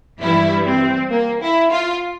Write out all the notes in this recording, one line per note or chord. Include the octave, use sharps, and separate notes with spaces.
G2 E3 G3 E4
C4
A#3
E4
F4